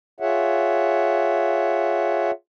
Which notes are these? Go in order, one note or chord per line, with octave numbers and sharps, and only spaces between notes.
F4 G#4 C#5 E5 F#5